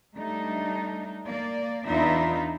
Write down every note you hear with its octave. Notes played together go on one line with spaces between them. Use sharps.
G3 A3 D4 D#4
A#3 D5
E2 D4 D#4 F4 B4 E5